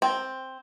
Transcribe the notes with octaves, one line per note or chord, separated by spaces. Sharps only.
C4